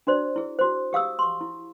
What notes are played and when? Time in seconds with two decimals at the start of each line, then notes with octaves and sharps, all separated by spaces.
0.07 D4 F#4 C5 D5
0.36 E4 G#4
0.59 F#4 C5
0.93 G4 F5 D#6 E6
1.19 C6 C#6
1.41 E4